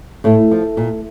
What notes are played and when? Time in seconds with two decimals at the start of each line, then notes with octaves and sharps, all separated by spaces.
0.24 A2 A3
0.51 F3
0.77 A#2